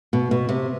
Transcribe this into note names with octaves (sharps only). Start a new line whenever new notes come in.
B2
B2
C3